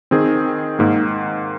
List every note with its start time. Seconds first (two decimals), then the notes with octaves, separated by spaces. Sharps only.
0.11 D#3 C4 G#4
0.79 G#2 D#3 A#3